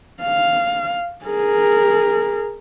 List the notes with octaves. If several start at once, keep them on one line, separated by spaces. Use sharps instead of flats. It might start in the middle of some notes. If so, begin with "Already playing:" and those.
F5
G#4 A#4